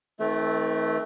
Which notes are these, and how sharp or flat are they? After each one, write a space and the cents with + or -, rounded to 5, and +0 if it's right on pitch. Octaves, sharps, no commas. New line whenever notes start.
D#3 +45 A3 -15 C4 +0